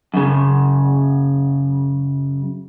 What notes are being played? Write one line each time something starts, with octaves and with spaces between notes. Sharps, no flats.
F#2 C#3